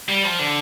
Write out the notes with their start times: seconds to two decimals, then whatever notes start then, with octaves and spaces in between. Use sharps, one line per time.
0.09 G3
0.24 F3
0.40 D3